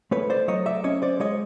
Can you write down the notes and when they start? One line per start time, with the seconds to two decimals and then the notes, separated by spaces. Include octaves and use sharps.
0.11 A3 B4 C#5
0.30 C5 D5
0.48 F#3 C#5 D#5
0.66 D5 E5
0.84 C#4 C#5 D#5
1.02 C5 D5
1.20 G#3 C#5 D#5